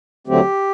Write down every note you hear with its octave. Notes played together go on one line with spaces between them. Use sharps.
D#2 D3 F#3 A3 C4 G4